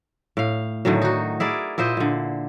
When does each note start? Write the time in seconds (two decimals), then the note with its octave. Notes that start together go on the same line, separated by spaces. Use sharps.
0.37 A2 F5
0.85 A2 D3 D#3 F#3
1.02 D#4 F#4
1.40 E4 G#4 A#4 D5
1.78 A#2 E4 C5 D#5
1.97 A#2 D3